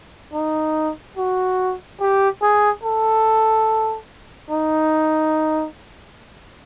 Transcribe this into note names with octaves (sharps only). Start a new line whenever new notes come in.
D#4
F#4
G4
G#4
A4
D#4